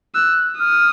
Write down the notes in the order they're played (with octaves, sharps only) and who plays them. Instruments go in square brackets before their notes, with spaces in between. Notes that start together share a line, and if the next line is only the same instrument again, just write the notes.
[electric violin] E6 [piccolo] F#6
[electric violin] D#6 [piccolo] F6